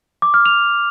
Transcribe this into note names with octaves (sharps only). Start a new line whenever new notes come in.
D6
F6
F7